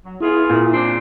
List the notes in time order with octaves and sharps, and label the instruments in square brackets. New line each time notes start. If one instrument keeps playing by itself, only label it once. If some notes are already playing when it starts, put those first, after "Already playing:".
[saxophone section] F#3
[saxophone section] B3 F4 G#4 [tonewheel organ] E4
[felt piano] A#2
[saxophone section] C#3 C4 D4